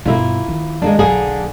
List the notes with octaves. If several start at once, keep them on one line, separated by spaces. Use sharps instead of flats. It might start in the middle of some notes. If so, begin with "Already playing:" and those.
G2 B2 A#3 E4 F4
D#3
D#2 G#3 A#3 D4
B1 D3 F#3 A#3 G#4